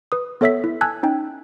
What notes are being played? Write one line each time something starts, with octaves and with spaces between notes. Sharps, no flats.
B4 D#6
B3 A4 C#5 E5 E6 B6
E4
G#5 A5 E6 F#6 G#6
C#4 D#4 G5